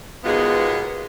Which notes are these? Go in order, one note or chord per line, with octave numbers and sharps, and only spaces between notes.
D#2 B2 G#3 B3 F4 G#4